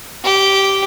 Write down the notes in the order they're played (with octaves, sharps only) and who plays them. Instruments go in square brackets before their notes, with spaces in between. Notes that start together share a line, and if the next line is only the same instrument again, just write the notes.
[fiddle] G4